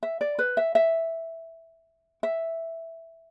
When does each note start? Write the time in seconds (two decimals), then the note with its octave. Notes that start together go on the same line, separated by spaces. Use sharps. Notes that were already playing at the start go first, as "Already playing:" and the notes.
0.03 E5
0.21 D5
0.39 B4
0.57 E5
0.75 E5
2.23 E5